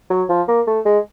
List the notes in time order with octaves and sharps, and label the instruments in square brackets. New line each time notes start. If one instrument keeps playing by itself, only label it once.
[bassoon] F#3
F3
A#3
A3
G#3